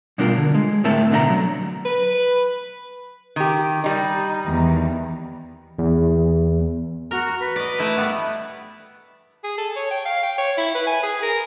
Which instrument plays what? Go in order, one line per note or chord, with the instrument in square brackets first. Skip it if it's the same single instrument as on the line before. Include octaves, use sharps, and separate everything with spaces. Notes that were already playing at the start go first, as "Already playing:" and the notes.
[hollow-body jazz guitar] B2 G3 D4 F4 A#4
D3
G#3
A2 C4 A#4 E5 A5
B2 D3 D#5 A#5
F#3
[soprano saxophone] B4
[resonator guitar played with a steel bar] D#3 G4
G3 D#4
[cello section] E2 D#3
[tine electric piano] E2
[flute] F#4 [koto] A#4
[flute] B4
[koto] D5 D#5
A3 E4 D5
G3 B3
[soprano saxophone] G#4
A4
C#5
G5
F5
G5
C#5
E4
B4
G#5
G#4
A#4